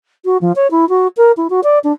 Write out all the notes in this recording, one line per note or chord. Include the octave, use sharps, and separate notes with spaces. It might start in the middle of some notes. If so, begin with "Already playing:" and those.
F#4
F3
C#5
E4
F#4
A#4
E4
F#4
D5
D4